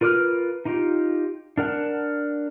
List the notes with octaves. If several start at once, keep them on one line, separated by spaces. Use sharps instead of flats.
F4 A#4 B4 D6 F6
D#4 F4 G4
D4 A#4 F#5 A5